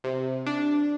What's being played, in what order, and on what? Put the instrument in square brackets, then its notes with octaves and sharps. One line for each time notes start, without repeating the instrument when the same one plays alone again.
[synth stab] C3
D4